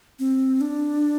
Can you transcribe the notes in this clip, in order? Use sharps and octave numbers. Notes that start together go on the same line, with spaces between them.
C4
D4